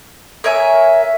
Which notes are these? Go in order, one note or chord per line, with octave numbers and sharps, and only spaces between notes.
A#4 C#5 E5 G#5